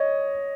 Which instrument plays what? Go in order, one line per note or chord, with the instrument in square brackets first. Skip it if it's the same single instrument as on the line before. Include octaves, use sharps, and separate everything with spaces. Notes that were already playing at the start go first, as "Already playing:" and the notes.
Already playing: [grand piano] C#5 D#5